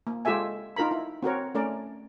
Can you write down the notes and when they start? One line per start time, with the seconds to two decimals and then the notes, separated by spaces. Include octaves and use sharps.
0.07 A#3
0.25 G#3 F4 G4 A4 E5 G#5
0.76 D#4 F4 A#4 A#5 B5
0.91 E4
1.23 C4 F#4 A#4 C#5
1.55 A3 C#4 A#4 D5